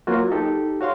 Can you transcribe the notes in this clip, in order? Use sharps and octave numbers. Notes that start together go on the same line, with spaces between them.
F#3 A#3 F4 F#4
D#4 G4 A4
F#4 C#5 F5 C6